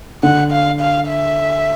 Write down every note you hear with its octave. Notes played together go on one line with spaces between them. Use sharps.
D3 F#5
F5
F5
E5